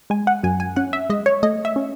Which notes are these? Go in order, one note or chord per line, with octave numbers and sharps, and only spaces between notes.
G#3 G#5
F#5
F#2 G#5
G#5
C#4 F#5
E5
G#3 D#5
C#5
A3 D#5
E5
C#4